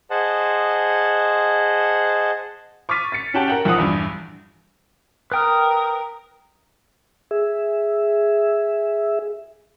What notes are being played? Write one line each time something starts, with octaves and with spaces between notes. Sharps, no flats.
G#4 C5 D#5 F#5 A5
C#6 D6 F6 A6 B6 D#7
A6 B6 C#7
C#4 F#4 G4 A5 D7 F#7
A#4 F#5 G5
B1 F3 F#5 D#6
A#1 E2 G2
A#4 B4 G5 D#6 F6
G#4 E5